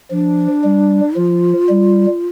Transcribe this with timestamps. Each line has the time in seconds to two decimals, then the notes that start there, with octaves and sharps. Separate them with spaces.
0.11 F3 D4
0.63 G3
1.16 F3 F4
1.69 G3